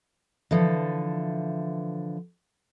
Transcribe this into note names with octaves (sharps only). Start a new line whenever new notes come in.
D3 E3 F3